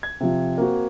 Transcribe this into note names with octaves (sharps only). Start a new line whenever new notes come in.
G#6
C3 F3
A#3 C4 F#4